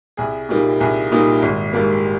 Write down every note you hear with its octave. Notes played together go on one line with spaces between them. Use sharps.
C2 G#4
A#2 G3 A#3 D#4
C2 G#4
A#2 G3 A#3 D#4
G#1
G#2 G3 A#3